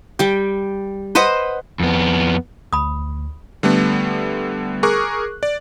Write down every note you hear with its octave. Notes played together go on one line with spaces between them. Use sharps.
G3 G5
B4 C5 D#5 F#5
F2 B3
D2 B5 D#6
D3 G3 A3 B3
G#4 A#4 C#6 D6 F#6
D5